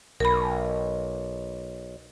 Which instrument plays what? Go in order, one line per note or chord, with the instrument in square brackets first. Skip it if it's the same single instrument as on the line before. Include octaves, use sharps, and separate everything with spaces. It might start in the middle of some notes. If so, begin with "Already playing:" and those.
[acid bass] B1 [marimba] A#4 B5